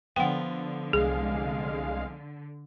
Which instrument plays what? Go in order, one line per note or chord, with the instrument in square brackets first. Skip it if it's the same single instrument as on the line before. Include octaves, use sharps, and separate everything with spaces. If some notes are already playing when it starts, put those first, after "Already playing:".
[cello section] D3 [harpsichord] F3 B3 [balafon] F#5 G5
[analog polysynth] C2 G#3 F5 [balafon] G#4